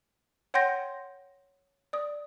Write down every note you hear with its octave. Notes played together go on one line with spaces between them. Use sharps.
C#5 F#5 G5 C6 G6 A#6
D5 D#6